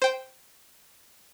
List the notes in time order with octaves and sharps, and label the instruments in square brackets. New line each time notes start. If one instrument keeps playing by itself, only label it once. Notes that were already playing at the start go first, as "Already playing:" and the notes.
[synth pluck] C5 G5